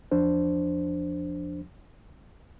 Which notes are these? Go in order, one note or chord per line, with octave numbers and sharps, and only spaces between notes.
E2 F3 D4 C5